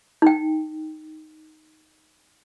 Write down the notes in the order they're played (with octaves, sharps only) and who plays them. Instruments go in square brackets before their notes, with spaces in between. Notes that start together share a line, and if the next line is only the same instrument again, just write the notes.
[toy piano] D#4 G5